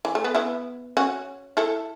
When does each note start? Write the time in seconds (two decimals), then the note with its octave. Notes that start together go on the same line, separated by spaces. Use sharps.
0.05 E3
0.15 A3
0.24 B3
0.35 B3 E4
0.97 C#4 F#4
1.57 E4 A4